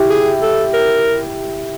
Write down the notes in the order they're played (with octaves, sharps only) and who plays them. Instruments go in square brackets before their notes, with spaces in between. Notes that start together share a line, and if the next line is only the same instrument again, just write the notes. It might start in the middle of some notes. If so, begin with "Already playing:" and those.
Already playing: [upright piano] E4 G4
[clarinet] G#4
A4
A#4